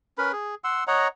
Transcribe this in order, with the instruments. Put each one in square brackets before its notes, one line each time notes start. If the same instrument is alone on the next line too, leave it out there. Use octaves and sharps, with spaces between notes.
[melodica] C#4 A#4 B4 B5
G#4
F#5 C6 E6
C#5 D#5 F#5 A#5